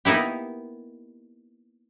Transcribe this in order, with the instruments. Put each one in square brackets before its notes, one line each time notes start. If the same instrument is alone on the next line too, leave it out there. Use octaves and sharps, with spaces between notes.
[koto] A#3 B3 D#4 E4 G4